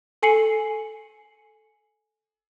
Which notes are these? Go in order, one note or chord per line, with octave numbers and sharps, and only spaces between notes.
A4 G#5 C7 C#7 F#7